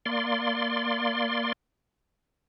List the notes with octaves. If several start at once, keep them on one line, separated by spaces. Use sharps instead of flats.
A#3 D5 C6